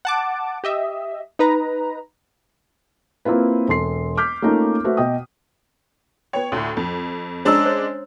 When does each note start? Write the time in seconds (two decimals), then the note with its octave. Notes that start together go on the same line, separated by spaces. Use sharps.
0.05 F#5 A5 D6
0.64 G4 D#5 E5
1.39 D#4 B4 A#5
3.25 A#3 C4 E4 F4 B4
3.68 E1 A4 C6 C7
4.17 D6 F6 G6 B6
4.42 A3 A#3 C#4 D#4 F4 A#4
4.84 A3 F#4 B4 C5 E5
4.97 B2 D#5 G5 D#6
6.33 B3 C#5 G5
6.52 D2 A2 C6
6.77 F2
7.45 G#3 C#4 D4 C5 A#5 E6
7.66 C5 C#5